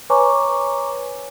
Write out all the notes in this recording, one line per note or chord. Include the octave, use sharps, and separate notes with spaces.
B4 C#5 G#5 A#5 C#6 D6